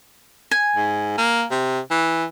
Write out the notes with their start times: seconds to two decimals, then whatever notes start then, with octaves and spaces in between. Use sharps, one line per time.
0.51 G#5
0.76 G#2
1.18 A#3
1.51 C3
1.91 E3